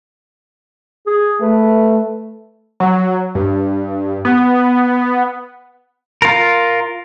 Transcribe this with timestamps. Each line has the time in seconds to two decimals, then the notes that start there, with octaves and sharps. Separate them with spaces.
1.07 G#4
1.42 A3 B4
2.80 F#3
3.35 G2
4.25 B3
6.22 F4 A#4